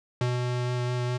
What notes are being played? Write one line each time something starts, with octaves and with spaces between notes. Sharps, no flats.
B2